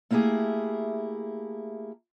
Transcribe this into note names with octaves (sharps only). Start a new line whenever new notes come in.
A3 A#3 E4 G4 G#4